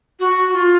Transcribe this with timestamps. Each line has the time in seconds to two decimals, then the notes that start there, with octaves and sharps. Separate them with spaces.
0.20 F#4
0.53 F4